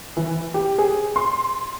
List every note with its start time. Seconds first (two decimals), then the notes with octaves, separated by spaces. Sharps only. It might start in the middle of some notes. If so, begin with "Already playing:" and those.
0.17 E3
0.54 G4
0.78 G#4
1.16 C6